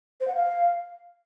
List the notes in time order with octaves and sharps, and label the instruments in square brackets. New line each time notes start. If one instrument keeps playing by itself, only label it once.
[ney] C5
F#5
F5